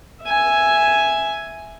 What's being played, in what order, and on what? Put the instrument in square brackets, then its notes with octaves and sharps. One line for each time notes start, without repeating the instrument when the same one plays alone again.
[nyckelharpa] E5 G#5